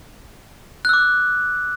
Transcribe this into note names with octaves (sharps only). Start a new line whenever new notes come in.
D6 E6 F#6